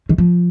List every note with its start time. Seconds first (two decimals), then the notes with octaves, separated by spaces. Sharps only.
0.09 D#3
0.18 F3